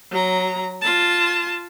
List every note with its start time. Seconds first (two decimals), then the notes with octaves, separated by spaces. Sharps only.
0.11 F#3 A#5
0.82 F4 A5